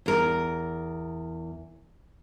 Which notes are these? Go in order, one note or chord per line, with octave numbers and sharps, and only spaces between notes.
E2 A#4